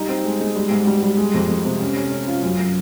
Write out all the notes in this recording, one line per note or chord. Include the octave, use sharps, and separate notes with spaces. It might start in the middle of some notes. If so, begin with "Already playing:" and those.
Already playing: G3 D#4
C4
G#3
G#3
G3
G#2
G3
G3
G#3
F2
F2
C3
C#4
C#4
C#4
F4
F#2